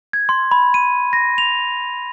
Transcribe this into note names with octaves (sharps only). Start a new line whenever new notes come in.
G#6
C6
B5
D#7
A#6
F7